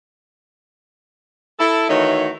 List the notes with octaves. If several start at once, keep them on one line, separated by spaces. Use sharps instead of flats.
E4 A4
D#3 E3 A3 D#4 F#4 C#5